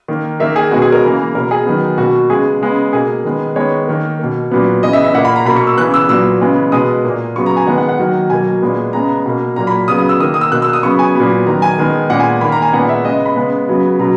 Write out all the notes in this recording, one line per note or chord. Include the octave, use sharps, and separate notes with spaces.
D#3 A#3
D#3 A#3 E5
G#4
B2 G#3 B3 F#4
G#4
A#4
C#3 E3 A#3
B2 A#3 A#4
G#4
D#3 F#3 B3
B2 A#3 F#4
C#3 G#3 B3 G#4
C#3 G#3 B3
B2 A#3 G#4
D#3 G#3 B3
D#3 G#3 B3 C#5
D#3 A#3
B2 A#3
A#2 F#3 B3
C#3 E3 B3 D#5
E5
E5
A#2 A#3 F#5
B5
A#5
B2 A#3 B5
C#6
E6
C#3 E3 B3 F#6
E6
A#2 F#3 B3 E6
C#3 E3 G#3 B3
B2 G#3 B3 D#6
A#2 A#3
C#3 F#3 B3 C#6
A#5
G#5
D#3 G#3 B3 F#5
F#5
F#5
D#3 F#3 A#3
B2 F#3 A#3 G#5
A#2 G#3 B3
C#3 G#3 B3 A#5
B2 A#3
A#2 F#3 A#3 A#5
B5
C#3 F#3 B3 D#6
D#6
E6
D#3 A#3 D#6
D#6
E6
B2 A#3 F#6
E6
D#6
C#3 F#3 B3 C#6
G#5
A#2 F#3 B3
D#3 F#3 B3 A#5
G#5
D#3 G#3 B3
A#2 G#3 B3 F#5
G#5
D#3 A#3 B5
A#5
G#5
A#2 G#3 B3 F#5
E5
C#3 G#3 B3 D#5
B5
C#3 G#3 B3
C#3 F#3 B3
B2 F#3 B3 A#5